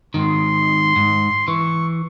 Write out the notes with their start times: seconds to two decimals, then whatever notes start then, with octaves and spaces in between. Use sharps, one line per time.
0.14 G#2 D#3 C6
0.96 G#2
1.48 E3 C#6